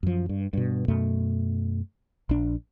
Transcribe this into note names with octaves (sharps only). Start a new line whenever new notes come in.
F#2 F3
G2
G2 B2
F#2 B2 A3
A#1 D4